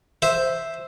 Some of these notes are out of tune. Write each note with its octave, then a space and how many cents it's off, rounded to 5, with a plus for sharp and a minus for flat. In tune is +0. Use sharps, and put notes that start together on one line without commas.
C5 +0 E5 +0